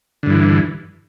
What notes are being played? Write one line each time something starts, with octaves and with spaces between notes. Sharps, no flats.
G2 D3 E3